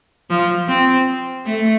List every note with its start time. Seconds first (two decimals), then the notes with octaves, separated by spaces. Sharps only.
0.30 F3
0.68 C4
1.46 A3